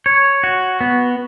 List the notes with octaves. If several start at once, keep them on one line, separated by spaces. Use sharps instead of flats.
C#5
F#4
B3